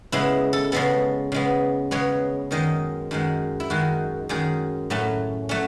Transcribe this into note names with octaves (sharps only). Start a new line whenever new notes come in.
C#3 G#3 B3 E4
A4
C#3 G#3 B3 A4
C#3 G#3 B3
C#3 G#3 B3 C#5
F#2 D#3 G#3 D#5
F#2 D#3 G#3
E4
F#2 D#3 G#3 F#4
F#2 D#3 G#3 G#4
A2 F#3 A3 C#4
F#3 A3 C#4